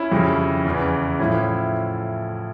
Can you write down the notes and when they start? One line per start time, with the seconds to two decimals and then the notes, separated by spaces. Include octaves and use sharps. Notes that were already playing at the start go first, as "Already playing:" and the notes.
Already playing: C#4 E4
0.12 F2 C#3 G3
0.65 E2 C#3 E3
1.19 A2 F3 C#4 E4